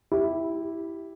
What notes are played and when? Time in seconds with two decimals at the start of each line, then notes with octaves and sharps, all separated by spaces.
0.12 E4 G4